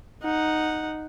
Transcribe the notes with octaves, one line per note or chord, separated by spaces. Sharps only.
D#4 F#5